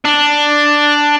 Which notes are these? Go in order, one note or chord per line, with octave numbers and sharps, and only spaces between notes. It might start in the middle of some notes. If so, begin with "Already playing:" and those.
D4